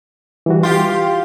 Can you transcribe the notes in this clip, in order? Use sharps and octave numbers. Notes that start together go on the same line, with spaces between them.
E3 G3 F#4
F4 G4 C6